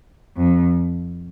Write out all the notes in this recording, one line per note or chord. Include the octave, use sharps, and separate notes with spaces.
F2